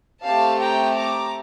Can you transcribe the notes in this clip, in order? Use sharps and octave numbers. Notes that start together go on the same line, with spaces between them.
A3 C4 G4 F5 A5
G5 A#5
A#5 D6